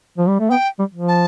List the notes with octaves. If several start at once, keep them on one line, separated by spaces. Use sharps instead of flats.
F3
G3
A3
B3 G5
G3
F3
A5